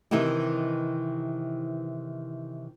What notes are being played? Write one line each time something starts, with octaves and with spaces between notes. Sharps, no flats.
C3 D#3 E3 D#4 E4 G4